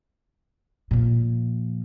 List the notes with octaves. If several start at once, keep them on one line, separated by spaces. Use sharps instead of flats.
A#2 F3